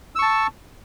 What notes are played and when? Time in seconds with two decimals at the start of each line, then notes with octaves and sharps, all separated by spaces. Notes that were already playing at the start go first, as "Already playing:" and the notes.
0.15 E6
0.19 C#6
0.22 A5